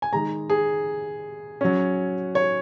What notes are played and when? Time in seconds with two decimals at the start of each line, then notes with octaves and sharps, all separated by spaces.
0.02 G#5
0.13 D#3 G#3 D#4 A#5
0.50 G#4
1.61 F#3 C#4
2.35 C#5